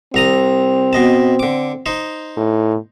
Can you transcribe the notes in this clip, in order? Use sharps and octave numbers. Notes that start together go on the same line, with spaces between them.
C2 C4 A#5 D#6
B2 D#5 A5
D3 D6
D#4 C5
A2